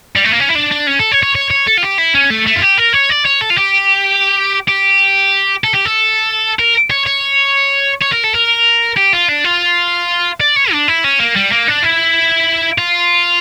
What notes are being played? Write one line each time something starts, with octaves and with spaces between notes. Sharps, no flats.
G3
A3
A#3
C#4
E4
D4
D4
C#4
A4
C#5
C#5
C#5
C#5
A4
F4
G4
E4
C#4
A3
A3
F4
G4
A#4
C#5
D5
C#5
A4
F4
G4
G4
A4
G4
A4
A#4
C#5
C#5
C#5
A#4
A4
A#4
G4
F4
D4
F4
D5
C#5
D4
E4
C#4
A#3
G3
A#3
D4
E4
F4